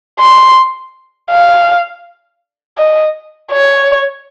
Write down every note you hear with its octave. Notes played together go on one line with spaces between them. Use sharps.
C6
F5
D#5
C#5